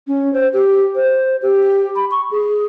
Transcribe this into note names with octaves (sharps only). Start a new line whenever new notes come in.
C#4
C5
G4
C5
G4
B5
C#6
G#4